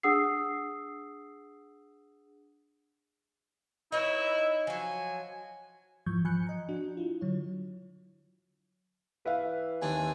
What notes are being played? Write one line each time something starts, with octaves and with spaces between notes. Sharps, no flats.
D4 G#4 F#5 D#6 E6 C7
D#4 E4 B4 C#5
F3 F#3 G#5
G#2 E3 F3 C#6 G6 G#6
F3 G#5 B5 F#6 G6 C#7
D#5 A#5
D4 F#4
E4 F4
D3 F#3 C#5
E3 B4 E5 F5
D#2 C4 D4 G#5